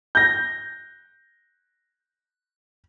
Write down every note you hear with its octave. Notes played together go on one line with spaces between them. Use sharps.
G6 A#6